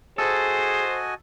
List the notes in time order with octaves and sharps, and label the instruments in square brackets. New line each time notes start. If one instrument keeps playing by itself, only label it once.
[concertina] F#4 D#5 G#5 [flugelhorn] G#4 [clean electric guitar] A4 [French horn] C5